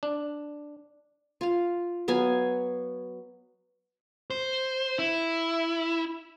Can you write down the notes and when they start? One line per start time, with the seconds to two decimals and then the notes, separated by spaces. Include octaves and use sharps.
0.03 D4
1.41 F4 F5
2.08 F#3 B3 F5 G#5
4.30 C5
4.99 E4